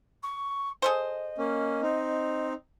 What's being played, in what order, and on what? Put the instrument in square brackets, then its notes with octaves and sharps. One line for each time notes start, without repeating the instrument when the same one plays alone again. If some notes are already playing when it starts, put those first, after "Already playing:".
[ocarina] C#6
[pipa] G#4 A4 C5 [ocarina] D#5
[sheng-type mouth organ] A#3 C#4
C4 D#4